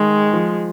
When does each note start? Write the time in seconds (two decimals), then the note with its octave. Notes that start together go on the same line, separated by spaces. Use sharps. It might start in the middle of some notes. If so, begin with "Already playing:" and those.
Already playing: D#3 G#3
0.33 F3